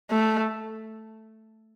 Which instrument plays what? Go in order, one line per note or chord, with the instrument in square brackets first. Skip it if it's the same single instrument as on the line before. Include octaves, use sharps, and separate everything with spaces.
[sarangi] A3